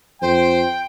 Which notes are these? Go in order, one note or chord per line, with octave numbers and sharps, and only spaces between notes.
F2 C5 G5